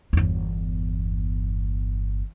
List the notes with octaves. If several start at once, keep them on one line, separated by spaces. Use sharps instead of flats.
G1 E2